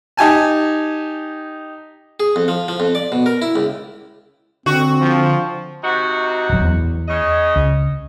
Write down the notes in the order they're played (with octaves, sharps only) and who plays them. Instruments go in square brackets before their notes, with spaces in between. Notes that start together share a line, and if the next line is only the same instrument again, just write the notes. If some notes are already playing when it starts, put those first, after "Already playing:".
[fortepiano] D#4 G4 G#5 A5
[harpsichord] G#4
F2
F3
F3
F2
D5
B2
A#4
E4
C#2
[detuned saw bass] D3 [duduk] C4 [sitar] F#4
[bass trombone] F3
[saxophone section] C3 D#4 F#4
[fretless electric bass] D1 A1 F#3
E2
[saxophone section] C#3 C#5 D#5
[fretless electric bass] C#2